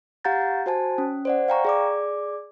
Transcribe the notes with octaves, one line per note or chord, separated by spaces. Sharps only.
G4 F5 F#5 A#5 G6 A6
F#4 C5 G#5 A5
C#4
C5 D5 F#5
F5 G5 A#5 C#6
G#4 D5 D6